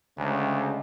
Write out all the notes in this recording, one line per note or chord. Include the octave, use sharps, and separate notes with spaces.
D2 C#3 G#3